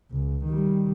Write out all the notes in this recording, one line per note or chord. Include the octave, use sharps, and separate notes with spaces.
C#2
D#3 G3